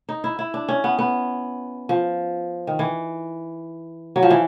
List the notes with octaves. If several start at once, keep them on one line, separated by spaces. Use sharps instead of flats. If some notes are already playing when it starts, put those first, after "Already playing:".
D#4
E4
E4
D4
C#4
B3
B3
F3
D#3
E3
F#3
F3
E3